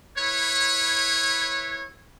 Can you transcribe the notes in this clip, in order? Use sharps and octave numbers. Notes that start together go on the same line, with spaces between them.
E4 B4 C#5